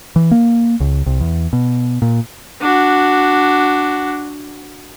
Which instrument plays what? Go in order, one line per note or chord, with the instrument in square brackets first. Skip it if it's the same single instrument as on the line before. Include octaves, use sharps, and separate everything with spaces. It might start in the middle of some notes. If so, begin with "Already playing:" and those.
[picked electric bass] E3
A#3
C#2
C2
E2
B2
A#2
[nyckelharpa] D4 F#4